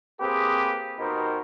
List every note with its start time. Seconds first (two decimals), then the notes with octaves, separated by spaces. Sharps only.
0.21 A#3 C4 G4 G#4 B4
0.99 B2 D#4 G4 A#4 C5